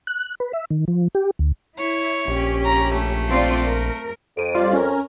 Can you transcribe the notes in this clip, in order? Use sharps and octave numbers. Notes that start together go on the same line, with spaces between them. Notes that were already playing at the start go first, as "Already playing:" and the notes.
F#6
B4
E5
D#3
F3
G4
D2
E4 C#5
A#1 C#4 G4
A#5
A3
C4 F4 D5
A#4
F2 D7 D#7
G3 F4 D5
C#4 A#4